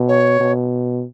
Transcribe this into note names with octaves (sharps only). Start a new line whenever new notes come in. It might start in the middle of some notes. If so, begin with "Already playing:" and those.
Already playing: B2
C#5
B2